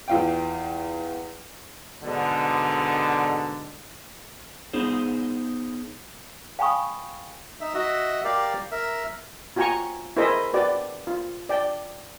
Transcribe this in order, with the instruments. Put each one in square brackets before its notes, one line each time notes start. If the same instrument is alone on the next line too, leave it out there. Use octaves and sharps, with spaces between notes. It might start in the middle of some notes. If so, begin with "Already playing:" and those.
[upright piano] E2 F4 G5
[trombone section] G#2 B2 D3
[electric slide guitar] B3 D#4 G#4 C5
[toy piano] F5 G5 G#5 B5 C#6 D#6
[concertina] D#4 E5
F#4 D#5 E5
G4 A#4 D5 F5
A#4 E5
[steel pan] F4 F#4 G5 G#5 A#5 C#6
E4 G#4 A#4 C5 D#5 E5
F#4 B4 D5 G5
F4
D5 G5